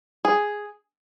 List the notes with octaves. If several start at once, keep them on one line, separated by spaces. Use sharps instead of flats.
G#4